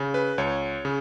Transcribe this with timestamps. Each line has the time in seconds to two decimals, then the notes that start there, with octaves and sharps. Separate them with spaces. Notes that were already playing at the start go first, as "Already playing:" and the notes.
Already playing: C#3
0.14 B4
0.38 C#2 C#5
0.85 C#3